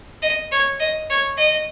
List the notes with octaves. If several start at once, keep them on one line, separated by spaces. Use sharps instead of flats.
D#5
C#5
D#5
C#5
D#5